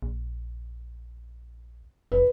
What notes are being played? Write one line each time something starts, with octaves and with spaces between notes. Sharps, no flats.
A#1
F1 B4